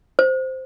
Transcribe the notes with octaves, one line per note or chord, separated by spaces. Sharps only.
C5